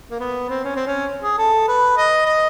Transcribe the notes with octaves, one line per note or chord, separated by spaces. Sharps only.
A#3
B3
C4
C#4
C4
C#4
G#4
A4
B4
D#5
D#5